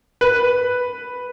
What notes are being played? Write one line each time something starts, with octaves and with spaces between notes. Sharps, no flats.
B4